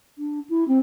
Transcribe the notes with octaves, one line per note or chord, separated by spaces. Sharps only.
D4
E4
C4